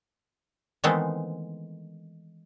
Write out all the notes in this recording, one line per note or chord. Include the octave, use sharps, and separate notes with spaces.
D#3 E3 G#3 A3 B3 C4